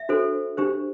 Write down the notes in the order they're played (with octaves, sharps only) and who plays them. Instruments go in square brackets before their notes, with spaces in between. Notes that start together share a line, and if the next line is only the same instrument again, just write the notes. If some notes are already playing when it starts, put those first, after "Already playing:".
Already playing: [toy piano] E5
D4 F#4 A4 C5
D4 G4 C5